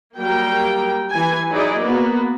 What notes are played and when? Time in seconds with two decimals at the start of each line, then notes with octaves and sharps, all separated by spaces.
0.17 F#3 G3 A#3 A#4 G5
1.11 E3 G#5
1.50 F#3 D#4 E4 G#4 D5 D#5
1.79 A#3 B3 F#4